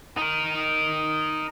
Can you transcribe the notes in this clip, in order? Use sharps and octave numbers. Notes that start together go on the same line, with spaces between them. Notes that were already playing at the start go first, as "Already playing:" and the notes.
D#4 A#4